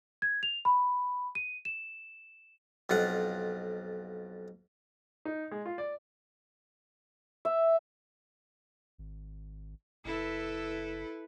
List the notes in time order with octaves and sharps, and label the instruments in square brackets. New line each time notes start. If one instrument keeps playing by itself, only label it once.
[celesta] G#6
F7
B5
D#7
E7
[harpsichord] B1 F2 F4 F#5
[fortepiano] D#4
G#3
F4
D5
[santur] E5
[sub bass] G#1
[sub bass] F#1 [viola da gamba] E4 A4 B4